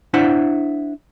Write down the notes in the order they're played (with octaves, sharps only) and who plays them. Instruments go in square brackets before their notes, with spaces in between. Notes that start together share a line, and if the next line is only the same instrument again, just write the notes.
[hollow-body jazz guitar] D4 E4 C5 F#5